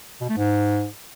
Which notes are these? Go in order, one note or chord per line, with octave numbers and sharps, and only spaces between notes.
B2
A3
G#2